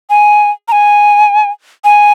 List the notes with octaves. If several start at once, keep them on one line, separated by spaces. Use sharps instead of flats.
G#5
A#5
G#5
G#5